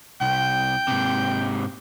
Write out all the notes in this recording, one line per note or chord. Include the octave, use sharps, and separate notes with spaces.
C2 G5
G#2 C3